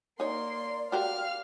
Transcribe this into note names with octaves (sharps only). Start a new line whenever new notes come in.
A#3 D#4 C#5 D5 C6
F#4 G4 A#4 F5 F6